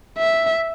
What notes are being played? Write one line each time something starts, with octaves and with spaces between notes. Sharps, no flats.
E5